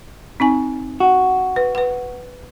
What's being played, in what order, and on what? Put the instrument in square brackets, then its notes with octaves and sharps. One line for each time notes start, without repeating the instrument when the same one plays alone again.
[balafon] C4 D#4 G#5
[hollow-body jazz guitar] F#4
[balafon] B4
B4 F#5